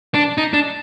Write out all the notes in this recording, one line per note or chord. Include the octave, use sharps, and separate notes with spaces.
D4
D#4
D4